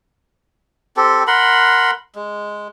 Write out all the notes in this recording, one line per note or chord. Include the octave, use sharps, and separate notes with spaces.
C4 G4 A4
A#4 F#5 B5 C6
G#3